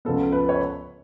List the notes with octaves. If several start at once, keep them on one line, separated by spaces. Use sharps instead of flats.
C#2 C#3 F3 B3 A4
B4
C#5